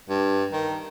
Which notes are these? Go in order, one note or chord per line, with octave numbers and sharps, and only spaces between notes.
G2
D#3